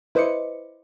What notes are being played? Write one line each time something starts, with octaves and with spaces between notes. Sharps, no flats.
E4 B4 C5 D#5 D6 C#7